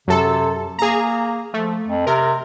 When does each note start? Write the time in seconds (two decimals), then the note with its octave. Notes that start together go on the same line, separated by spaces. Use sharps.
0.08 F#2 C3 A4
0.79 A#3 G#4 A#5
1.54 F3 A3
1.88 F2
2.07 C3 A#4